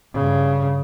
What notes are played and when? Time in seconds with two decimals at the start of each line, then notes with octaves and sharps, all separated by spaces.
0.14 G2 C#3